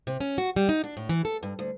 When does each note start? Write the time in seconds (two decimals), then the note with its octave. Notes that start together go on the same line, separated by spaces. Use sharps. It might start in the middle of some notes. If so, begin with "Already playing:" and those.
0.07 C3
0.20 C#4
0.38 F#4
0.56 G3
0.69 D#4
0.84 D4
0.97 A2
1.09 E3
1.25 A4
1.43 G2
1.59 D2